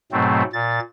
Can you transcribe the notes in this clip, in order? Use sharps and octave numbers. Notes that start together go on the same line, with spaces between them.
G#2 B2 F#3 A3 C4
A#2 A6